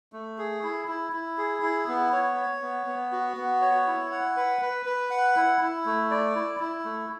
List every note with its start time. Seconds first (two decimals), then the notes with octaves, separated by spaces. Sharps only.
0.13 A3
0.38 G#4
0.63 E4
0.88 E4
1.13 E4
1.38 G#4
1.63 E4
1.88 B3
2.12 C#5
2.37 C#5
2.62 B3
2.87 B3
3.12 F#4
3.37 B3
3.62 C#5
3.87 E4
4.11 F#5
4.36 B4
4.62 B4
4.86 B4
5.10 F#5
5.36 E4
5.61 E4
5.86 A3
6.11 D5
6.35 E4
6.60 E4
6.85 A3